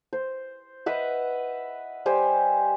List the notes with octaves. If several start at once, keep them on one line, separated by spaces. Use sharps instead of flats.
C5
B4 D#5 E5 F#5
G3 G4 C5 G#5